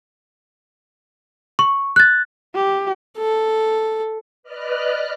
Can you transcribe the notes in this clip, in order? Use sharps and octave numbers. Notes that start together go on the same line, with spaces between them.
C#6
F#6 A6
G4
A4
B4 D5 D#5 F6 F#6